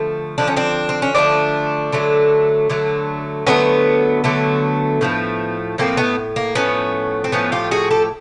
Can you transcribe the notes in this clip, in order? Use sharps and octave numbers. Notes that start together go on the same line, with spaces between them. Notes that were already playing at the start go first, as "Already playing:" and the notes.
Already playing: D3 F3 A3
D3 F3 A3 D4
C#4
C4 D4
C4
C#4
D3 F3 A3 C4 D4
D3 F#3 A3
D3 F#3 A3
D3 F#3 A3 B3 C#4
D3 F#3 A3
A2 F3 A3
A2 F3 A3 A#3 C4
A3 B3
A#3
A2 F3 A3 B3 C#4
C4
A2 F3 A3 B3 C#4
F4 G4
F#4 G#4
G4 A4